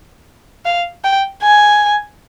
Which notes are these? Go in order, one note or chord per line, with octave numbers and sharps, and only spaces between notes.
F5
G5
G#5